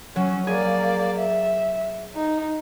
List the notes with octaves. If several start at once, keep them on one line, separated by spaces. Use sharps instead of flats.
F#3 C#4
A#3 G#4 D5
E5
D#4